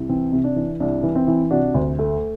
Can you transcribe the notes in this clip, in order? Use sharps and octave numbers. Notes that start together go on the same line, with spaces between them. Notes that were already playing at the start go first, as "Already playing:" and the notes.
Already playing: C2
E3 C4
C3
D4
E3
C2 D4
E3
C4 E4
E3
C3 D4 F#4
D2
A3